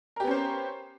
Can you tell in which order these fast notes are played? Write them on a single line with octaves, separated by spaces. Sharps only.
A#4 G4 B3 C#4 C5